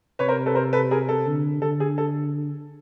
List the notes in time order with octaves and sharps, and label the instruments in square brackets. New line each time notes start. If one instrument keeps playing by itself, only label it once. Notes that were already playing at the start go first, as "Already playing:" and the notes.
[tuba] C3 [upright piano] B4 C#5
[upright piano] A#4 C5
A4 B4
A#4 C5
A4 B4
G#4 A#4
A4
[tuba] D3
[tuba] D3 [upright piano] A4
[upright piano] G#4
A4